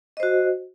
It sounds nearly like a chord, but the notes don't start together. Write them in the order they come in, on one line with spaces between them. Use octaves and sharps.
D#5 C5 F#4